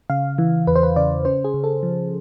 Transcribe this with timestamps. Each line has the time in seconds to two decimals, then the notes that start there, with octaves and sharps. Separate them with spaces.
0.10 C#3 F5
0.38 E3
0.67 E2 B4
0.76 C5
0.83 B4
0.96 C#3 D5
1.25 C#4 C5
1.44 G#4
1.54 C#3
1.64 A4
1.83 F3